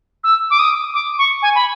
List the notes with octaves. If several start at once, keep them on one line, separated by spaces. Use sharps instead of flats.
E6
D6
D#6
D6
C#6
G#5
B5